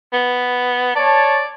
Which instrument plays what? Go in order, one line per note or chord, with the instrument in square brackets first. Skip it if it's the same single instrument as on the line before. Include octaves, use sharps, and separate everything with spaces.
[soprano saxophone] B3
[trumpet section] C#5 A5 [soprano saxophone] D5